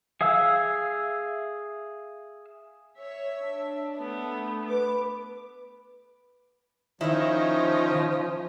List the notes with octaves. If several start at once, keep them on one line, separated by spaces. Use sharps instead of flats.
G#4 E5 F5 E6
C#5 E5
D4
A3 B3
B4 D6
D#3 F3 C#4 E4 E5